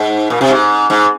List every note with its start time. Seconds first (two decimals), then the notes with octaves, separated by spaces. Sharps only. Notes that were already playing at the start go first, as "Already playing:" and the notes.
Already playing: G#2
0.30 A#2
0.41 C3
0.50 G#2
0.90 G#2